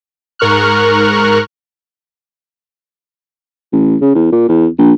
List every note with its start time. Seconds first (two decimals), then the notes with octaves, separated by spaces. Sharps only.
0.39 G#2 A#4 C#6 F6 F#6
3.72 A1
4.01 C#3
4.15 E2
4.32 A#2
4.49 E2
4.78 A#1